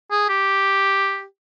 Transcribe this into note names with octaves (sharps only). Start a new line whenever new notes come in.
G#4
G4